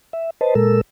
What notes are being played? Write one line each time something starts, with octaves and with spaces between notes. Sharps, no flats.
E5
B4 C5 D#5 A5
A#2 G#3 A4 A#4 E6